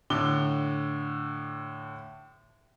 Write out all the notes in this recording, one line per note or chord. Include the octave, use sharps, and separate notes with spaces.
A2 D3 D6 G7